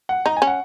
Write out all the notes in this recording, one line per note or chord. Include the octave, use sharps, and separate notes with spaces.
F#5
D#4 A#5
G#5
C#4
F#5